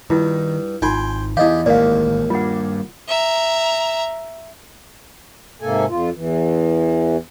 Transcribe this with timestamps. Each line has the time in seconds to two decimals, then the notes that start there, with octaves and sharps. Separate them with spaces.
0.10 G2 D#3 E4 F4
0.82 G#1 D#4 F4 G5 G#5 C6
1.37 E3 B3 E4 G4 G#4 D#5 F5
1.66 A1 D#2 D#3 G#3 A#3 D5 F5
2.30 G3 D4 F4 F#5
3.08 E5 A#5
5.62 G#2 C3 A#3 A4 G#5
5.90 F2 F4
6.15 E2 E3